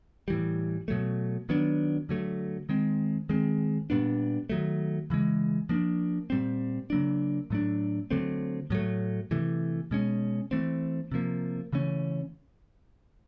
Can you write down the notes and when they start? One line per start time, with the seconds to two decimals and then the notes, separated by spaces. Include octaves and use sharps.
0.28 A2 E3 G3
0.88 B2 F#3 A3
1.49 D#3 F#3 B3 D4
2.09 D3 F#3 A3
2.69 D#3 G#3 C4
3.29 D#3 G#3 C4
3.90 A#2 G3 B3 D4
4.49 D#3 F#3 A3
5.10 C#3 E3 G#3
5.69 F3 A#3 D4
6.30 A#2 G3 C4
6.90 C#3 F#3 A#3 D4
7.50 A2 F#3 A3 D4
8.11 D3 F#3 A3 C4
8.70 A2 F#3 A3
9.31 C3 E3 A3
9.91 B2 G#3 C#4
10.51 E3 A3 C4
11.12 C3 F3 A#3
11.73 C#3 E3 A3 C#4